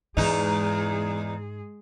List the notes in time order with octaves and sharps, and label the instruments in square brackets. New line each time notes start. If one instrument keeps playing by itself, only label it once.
[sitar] E2 D#4 [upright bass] G#2 [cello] G#3 G#4